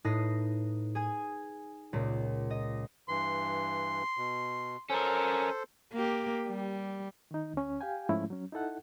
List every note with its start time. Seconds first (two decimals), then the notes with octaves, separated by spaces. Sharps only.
0.04 A2 D#4 B4 D#6 A#6 C7
0.95 G#4 G#5 G#6
1.93 C#2 A#2
2.51 D#5
3.09 G2 E3 C6
4.17 B2
4.90 C#4 A4 A#4 C5
5.93 A#3 G4
6.48 G3
7.31 D#3 D#4
7.54 D2 C#4
7.81 G4 F5 G5 G#5
8.09 G#2 F3 G#3 A3 C#4 E4
8.30 F#3 C#4
8.52 D#4 E4 A4 F#5